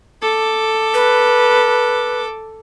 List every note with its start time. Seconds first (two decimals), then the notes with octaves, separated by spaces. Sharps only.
0.22 A4 D6
0.94 B4